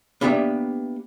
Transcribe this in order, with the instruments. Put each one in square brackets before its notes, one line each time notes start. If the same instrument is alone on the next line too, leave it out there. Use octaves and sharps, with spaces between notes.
[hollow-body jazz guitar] A#3 B3 D4 G4 D5 E5